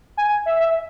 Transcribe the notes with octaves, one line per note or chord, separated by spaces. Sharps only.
G#5
E5
E5